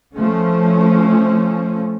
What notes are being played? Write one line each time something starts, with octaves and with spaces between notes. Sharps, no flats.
F3 A3 C#4